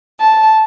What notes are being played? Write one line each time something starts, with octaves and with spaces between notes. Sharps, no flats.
A5